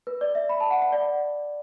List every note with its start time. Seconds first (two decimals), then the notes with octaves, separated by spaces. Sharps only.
0.07 B4
0.21 D5
0.35 E5
0.49 B5
0.60 A5
0.70 F#5
0.82 F#5
0.92 D5